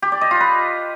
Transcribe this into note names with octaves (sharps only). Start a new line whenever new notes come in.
G4
D5
D#5
F4
B4